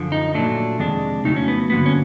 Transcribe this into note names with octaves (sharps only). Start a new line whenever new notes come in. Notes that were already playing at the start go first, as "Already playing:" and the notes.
Already playing: F#2 D3 F3
D#4
A#2 F#3 A3 D4
F2 C3 D#3 G#3 D4
F2 C#3 F#3 A3 D#4
C#4
B3
G2 D3 F#3 A#3 B3
C#4